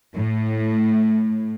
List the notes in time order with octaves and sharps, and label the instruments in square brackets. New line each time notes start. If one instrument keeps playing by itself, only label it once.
[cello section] A2